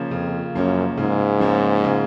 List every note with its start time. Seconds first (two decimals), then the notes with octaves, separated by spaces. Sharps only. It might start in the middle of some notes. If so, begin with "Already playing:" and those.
Already playing: C#3 F3 A#3 C#4
0.11 F2 C#3
0.55 F#2 F3 A#3 C#4
0.97 G#2 C#3
1.40 F3 A#3 C#4
1.84 C#3